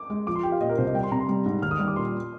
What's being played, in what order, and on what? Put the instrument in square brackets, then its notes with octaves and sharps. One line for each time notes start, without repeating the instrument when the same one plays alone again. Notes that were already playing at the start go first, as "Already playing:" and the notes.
Already playing: [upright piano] D6
[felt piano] G#3
[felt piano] F3 [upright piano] D6
[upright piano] C6
[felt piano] G4 [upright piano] G5
[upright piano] F5
[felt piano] A#2 [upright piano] D#5
[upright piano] A#4
[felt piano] C2 [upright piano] C5
[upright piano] D#5
[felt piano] G3 [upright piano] G5
[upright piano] C6
[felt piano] C3 [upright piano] A#5
[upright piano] C6
[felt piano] G3
G#2
[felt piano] D#2 [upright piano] F6
[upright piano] D#6
[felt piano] G3 [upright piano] F6
[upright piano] D6
[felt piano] A#2 [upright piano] C6